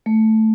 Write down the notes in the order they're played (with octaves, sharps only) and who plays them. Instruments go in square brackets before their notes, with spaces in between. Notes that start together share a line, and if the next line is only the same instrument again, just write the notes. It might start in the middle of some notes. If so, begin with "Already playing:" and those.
[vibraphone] A3